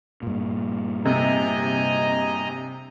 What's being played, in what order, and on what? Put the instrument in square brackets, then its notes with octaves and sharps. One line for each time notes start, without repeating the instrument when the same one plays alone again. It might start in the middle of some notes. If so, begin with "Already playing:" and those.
[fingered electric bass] G2 A#2
[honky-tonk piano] C3 [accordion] D#5 G#5 A#5